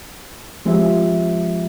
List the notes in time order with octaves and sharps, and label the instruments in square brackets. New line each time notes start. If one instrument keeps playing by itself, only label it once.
[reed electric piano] F3 G#3 C4 F4 G4 E5